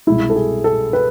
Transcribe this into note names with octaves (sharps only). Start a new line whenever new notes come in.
C2 B2 G#3 E4
A4
G#4
A4
B4